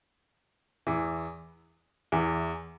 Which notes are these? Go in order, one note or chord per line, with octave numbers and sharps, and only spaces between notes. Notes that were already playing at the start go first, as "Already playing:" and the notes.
E2 E3
E2 E3